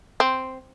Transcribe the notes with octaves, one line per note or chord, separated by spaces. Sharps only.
C4